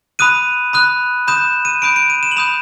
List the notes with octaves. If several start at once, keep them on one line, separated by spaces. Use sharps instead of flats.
B5 D#6 F#6 D#7
B5 D#6 F#6
B5 D#6 G6 E7
D#7
B5 D#6 G6 D7
D7
D#7
E7
F#7
B5 D#6 G6 F7